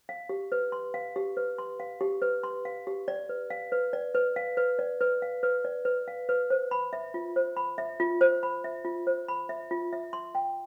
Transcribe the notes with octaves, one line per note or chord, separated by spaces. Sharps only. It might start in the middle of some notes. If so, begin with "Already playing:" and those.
F5
G4
B4
C6
F5
G4
B4
C6
F5
G4
B4
C6
F5
G4
D5
B4
F5
B4
D5
B4
F5
B4
D5
B4
F5
B4
D5
B4
F5
B4
C5
B5
E5
F4
C5
B5
E5
F4
C5
B5
E5
F4
C5
B5
E5
F4
E5
C6
G5